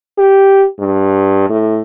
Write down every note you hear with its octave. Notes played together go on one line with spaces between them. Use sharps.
G4
G2
A2